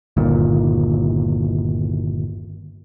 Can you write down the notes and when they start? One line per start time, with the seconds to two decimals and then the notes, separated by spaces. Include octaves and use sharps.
0.17 G1 D#2 A#2